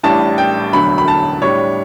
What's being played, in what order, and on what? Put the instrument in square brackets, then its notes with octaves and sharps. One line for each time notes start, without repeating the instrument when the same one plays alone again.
[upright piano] A1 A2 G3 D4 A5
G5
E1 D2 D3 F#3 B5
B5
A5
A2 G3 D4 C#5